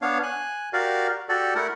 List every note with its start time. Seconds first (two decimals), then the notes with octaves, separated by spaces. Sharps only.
0.02 B3 D4 C#5 F5
0.23 G#5 F#6
0.73 F#4 G4 A#4 D5 F5
1.29 F#4 G4 A4 D5
1.55 A3 E4 A#4 F#5